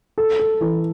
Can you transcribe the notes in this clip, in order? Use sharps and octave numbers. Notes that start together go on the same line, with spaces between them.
A4
A4
E3